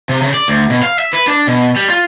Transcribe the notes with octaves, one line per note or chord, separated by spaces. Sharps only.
C3
C#3
D5
D2
B2
F5
E5
B4
D4
B2
G3
F4